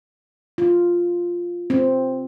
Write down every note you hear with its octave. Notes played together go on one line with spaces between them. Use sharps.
F4
C4